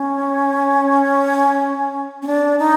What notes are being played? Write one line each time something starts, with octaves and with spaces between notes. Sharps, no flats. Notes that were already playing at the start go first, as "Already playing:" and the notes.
Already playing: C#4
C#4
D4
D#4